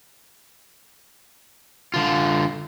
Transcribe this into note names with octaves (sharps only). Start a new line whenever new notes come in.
D3 F4